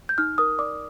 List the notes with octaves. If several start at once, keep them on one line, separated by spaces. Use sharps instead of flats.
G6
D#4 F6
A#4 D#6
D5 D6